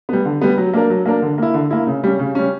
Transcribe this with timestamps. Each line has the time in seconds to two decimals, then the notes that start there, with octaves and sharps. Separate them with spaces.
0.09 G3 B3
0.25 D3
0.41 G3 B3
0.58 F#3
0.74 A#3 D4 A#4
0.90 F#3
1.06 A#3 D4 A#4
1.22 D3
1.38 A#3 E4
1.54 D3
1.71 A#3 E4
1.87 C#3
2.04 G3 C#4
2.19 C#3
2.35 G3 C#4